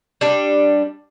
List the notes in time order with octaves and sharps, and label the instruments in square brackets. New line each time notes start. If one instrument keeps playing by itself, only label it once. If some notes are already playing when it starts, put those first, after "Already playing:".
[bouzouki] G3 D4